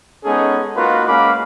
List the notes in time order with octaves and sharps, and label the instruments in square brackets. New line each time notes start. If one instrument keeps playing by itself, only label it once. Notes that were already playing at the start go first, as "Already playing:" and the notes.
[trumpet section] G#3 B3 C#4 D#4 G#4 A4
A#3 D#4 F4 F#4 A#4 B4
G#3 A#3 C#4 F5 B5 D6